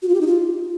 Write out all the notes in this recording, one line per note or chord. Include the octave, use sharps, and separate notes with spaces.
F#4
F4
G4
D#4
F4